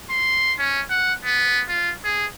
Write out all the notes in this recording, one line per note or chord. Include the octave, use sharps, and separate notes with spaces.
C6
C#4
F#5
B3
F4
G#4